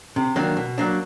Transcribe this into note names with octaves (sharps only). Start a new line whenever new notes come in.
C3
D#3 F#3 A#3 D4
B2
F#3 A#3 D4